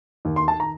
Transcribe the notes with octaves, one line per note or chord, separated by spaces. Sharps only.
D#2
C6
D#3 A5
A#5